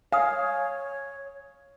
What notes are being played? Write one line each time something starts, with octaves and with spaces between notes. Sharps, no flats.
C#5 F5 G#5 D#6